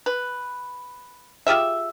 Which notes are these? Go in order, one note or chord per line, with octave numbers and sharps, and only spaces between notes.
B4
F4 G4 G#4 E5